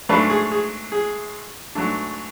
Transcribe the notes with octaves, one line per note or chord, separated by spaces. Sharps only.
G#2 F#3 A3 D4 B4
G#4
G#4
G#4
G#2 F#3 A3 D4